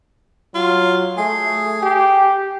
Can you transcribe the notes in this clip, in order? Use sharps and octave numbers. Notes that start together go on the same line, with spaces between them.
F#3 F4
A3 G#4
G4